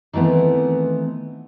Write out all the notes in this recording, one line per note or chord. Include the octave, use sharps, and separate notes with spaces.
D#3 E3 A3 B3 C4